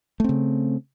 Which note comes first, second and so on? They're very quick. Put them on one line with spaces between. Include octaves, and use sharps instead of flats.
A3 C4 C#3